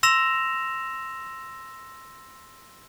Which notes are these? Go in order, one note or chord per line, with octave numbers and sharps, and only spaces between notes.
C6 E6 A#6 E7 F7